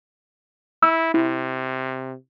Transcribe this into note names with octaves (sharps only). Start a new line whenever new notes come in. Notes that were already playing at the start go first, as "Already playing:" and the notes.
E4 E6
C3 E4